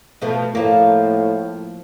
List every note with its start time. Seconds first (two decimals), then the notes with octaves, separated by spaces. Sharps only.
0.21 B2 F3 A3
0.55 A2 F3 A#3